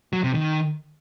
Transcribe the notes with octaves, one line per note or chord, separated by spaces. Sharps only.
F#3
C3
D#3